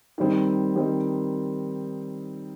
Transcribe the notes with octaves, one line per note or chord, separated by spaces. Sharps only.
D#3 G3 C4 D#4
D#3 G3 C4 D#4